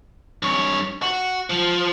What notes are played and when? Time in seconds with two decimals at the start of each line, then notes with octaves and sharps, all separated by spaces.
0.42 G2 C#5
1.02 F#4
1.50 F3